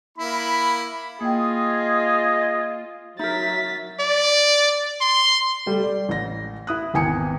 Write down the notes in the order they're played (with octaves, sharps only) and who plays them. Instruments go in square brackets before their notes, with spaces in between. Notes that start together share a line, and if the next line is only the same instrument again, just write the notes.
[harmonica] A#3 E4 [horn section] B5
[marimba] A#3 G5 [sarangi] F4 [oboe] G#4 [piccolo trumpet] D#5
[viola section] F#3 [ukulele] D#4 A#4 [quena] E5 [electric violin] A6 B6
[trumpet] D5
C6
[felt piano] G3 A3 A4
D5
A1 A#6
E4 D#6 F#6
G#1 E2 G5 G#5 D#6 C#7